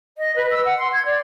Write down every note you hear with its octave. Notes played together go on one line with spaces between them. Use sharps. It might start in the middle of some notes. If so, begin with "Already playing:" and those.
D#5
B4
E6
F#5
C6
G#6
D5